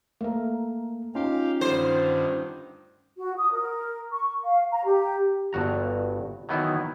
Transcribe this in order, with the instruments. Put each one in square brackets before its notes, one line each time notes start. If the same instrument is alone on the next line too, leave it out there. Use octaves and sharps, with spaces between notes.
[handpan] A3 A#4 [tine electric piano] A#3
[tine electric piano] C#4 D#4 F4 [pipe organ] G4 F5
[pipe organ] G2 D3 D#3 [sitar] C5
[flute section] F#4
D#6
A#4
C#6
F5
A#5
G4
[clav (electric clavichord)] G1 G2 F#4 A#5
D#3 E3 F#3 B3 D#4 E4